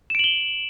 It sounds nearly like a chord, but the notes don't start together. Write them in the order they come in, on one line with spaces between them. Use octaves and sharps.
E7 D7 F#7 G7